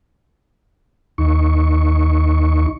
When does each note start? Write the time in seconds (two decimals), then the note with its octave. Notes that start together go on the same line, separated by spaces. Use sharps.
1.18 D#2 D#4 C#6